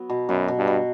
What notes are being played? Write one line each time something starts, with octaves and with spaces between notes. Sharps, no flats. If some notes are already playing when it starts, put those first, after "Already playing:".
Already playing: F#3 B3
B2
F#2 B2
B2
G2
B2